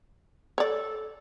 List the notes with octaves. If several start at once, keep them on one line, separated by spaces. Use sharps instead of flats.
A4 C#5 D5